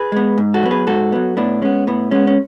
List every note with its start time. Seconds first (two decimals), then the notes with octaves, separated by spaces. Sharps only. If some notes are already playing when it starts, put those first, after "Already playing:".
Already playing: G#4 B4
0.12 G#3 B3
0.38 G#2
0.54 F#4 A4
0.63 F#3 B3
0.71 G#4 B4
0.87 G#2 F#4 A4
1.12 F#3 B3
1.37 A2 B3 D4
1.62 G#3 B3 C#4
1.87 A2 B3
2.11 G#3 B3 C#4
2.27 C#4